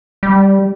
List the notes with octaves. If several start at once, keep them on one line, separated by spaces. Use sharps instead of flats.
G3